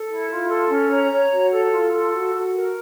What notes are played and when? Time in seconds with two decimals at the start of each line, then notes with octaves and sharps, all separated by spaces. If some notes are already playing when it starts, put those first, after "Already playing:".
Already playing: A4
0.09 E4
0.29 F4
0.49 A4
0.70 C#4
0.90 C#5 A#5
1.11 C#5
1.32 F#4
1.51 A4
1.72 F4
1.92 A4
2.13 F#4
2.33 F#4
2.53 A#4